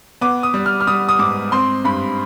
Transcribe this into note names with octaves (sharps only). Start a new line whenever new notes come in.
B3 D6
D#6
G3
F6
F6
G3 D#6
D#6
G#2 D6
C4 C6
G2 B5